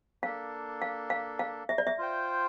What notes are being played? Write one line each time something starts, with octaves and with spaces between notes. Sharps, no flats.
A#3 D4 A4 F5
F5
F5
F5
E5
D5
E5
F4 C5 G5